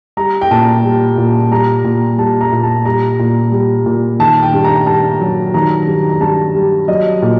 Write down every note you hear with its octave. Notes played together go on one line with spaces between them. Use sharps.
G3 A#5
G5
A#2 A5
G3
A#2
G3 A#5
A#2
G3 A5
A#5
A#2
A5
G3 A#5
A#2
G3
A#2
D#3 A5
G5
G2
A#5
G2 A5
F#3
D#3 A#5
G2
A#5
G2 A5
G3
F#3 D#5
A#2